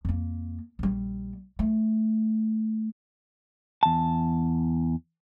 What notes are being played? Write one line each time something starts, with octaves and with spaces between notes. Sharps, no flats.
F2 A#3
A#1 G3
A3
E2 A5